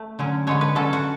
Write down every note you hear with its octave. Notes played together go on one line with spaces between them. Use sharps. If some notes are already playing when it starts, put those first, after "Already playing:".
Already playing: A3
D3 F#3 C#4
D3 G#3 B3 C#5
B4
D3 F#3 C#4 A4
F#4